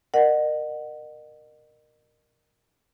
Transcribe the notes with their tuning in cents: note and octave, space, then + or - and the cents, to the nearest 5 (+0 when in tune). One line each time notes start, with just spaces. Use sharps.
A#4 +0 D#5 -40 F#5 +0